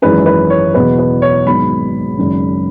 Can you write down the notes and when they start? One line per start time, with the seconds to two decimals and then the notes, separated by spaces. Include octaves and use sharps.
0.02 G#1 F#2 E3 G#3 C#4 B4
0.26 B4
0.50 C#5
0.74 F#1 E2 B2 B3 B4
0.99 B4
1.22 C#5
1.46 G#1 G#2 F#3 B3 B5
2.18 G#1 F#2 C#3